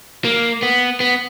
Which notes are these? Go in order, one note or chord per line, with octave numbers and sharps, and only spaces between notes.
A#3
B3
B3